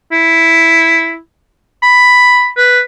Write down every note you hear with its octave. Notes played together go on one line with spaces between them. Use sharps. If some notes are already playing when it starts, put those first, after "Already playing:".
E4
B5
B4